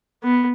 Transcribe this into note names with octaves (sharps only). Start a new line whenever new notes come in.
B3